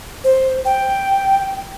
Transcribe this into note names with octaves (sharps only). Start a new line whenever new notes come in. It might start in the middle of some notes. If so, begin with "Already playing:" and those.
C5
G5